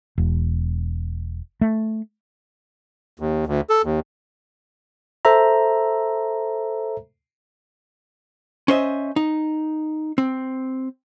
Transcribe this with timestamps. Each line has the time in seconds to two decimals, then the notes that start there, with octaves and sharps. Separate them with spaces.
0.18 E1
1.61 A3
3.20 D#2
3.47 D2
3.70 A4
3.84 D#2
5.25 A4 C5 E5 A#5
8.68 C#4 C5 D#5 E5
9.16 D#4
10.18 C4